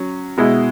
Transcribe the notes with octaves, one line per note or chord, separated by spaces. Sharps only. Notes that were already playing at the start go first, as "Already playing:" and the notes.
Already playing: F#3 C#4
B2 G#3 E4